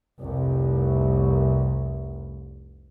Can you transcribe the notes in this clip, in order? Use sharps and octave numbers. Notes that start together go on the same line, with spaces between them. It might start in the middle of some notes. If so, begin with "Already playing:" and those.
F1 C2